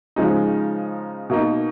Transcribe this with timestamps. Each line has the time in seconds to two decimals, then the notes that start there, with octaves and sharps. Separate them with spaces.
0.16 C#3 F3 G#3 D#4
1.30 B2 A#3 D#4